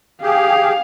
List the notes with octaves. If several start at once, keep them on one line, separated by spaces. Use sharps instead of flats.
G4 G#4 F5